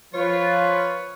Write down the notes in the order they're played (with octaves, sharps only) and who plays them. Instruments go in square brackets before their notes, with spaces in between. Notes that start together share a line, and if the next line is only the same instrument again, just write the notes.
[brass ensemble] F3 [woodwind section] F4 [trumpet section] B4 [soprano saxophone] C#5